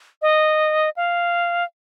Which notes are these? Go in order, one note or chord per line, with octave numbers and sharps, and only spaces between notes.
D#5
F5